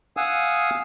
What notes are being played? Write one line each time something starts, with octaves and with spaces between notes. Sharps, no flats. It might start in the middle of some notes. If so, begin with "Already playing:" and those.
F5 F#5 G#5 D#6 E6